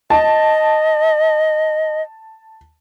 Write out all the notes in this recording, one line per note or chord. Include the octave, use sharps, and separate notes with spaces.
D#5 A5